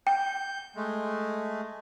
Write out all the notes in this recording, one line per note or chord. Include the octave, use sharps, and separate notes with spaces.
G5 G6
G#3 A3